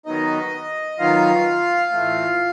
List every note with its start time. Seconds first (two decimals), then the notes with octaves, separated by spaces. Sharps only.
0.06 D#3 F#3 B3 D#4 D#5
0.99 D#3 F#3 B3 D#4 F4 F5
1.91 A2 E3 A3